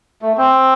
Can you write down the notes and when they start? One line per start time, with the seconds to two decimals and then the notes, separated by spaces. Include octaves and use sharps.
0.22 A3
0.37 C4